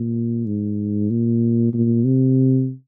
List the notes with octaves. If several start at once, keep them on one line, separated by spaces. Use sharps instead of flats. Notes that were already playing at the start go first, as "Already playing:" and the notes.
Already playing: A#2
G#2
A#2
A#2
C3